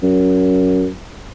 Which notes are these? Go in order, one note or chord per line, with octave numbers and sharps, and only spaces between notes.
F#2